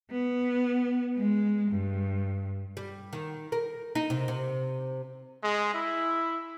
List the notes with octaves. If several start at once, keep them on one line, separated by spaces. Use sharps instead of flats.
B3
G#3
G2
G3
D#3
A#4
D#4
C3
C3
G#3
E4